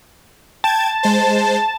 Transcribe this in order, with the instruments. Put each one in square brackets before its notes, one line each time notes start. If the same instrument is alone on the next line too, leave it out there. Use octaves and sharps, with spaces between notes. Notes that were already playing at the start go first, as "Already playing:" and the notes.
[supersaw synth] G5 G#6 [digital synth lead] A5
[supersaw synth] G#3 C5